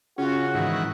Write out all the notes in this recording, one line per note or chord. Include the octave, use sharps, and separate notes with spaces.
C#3 C#4 F4 F#4
G#2 D#3 E3 F#5